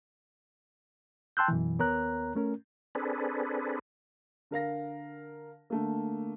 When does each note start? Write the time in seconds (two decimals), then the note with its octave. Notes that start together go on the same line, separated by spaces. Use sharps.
1.37 G5 A5 C6 E6 F#6 G6
1.48 F#2 B2 E3
1.79 D#2 B3 A#4 C#5 A#5 F#6
2.35 A3 C#4 A#4
2.95 C4 D4 G#4 A4 B4
4.51 D3 A#4 F5 A#6
5.70 D3 A3 A#3